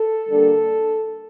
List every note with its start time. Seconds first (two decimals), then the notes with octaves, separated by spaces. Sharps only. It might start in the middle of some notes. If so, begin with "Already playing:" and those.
Already playing: A4
0.27 D3 G3 A#3 D4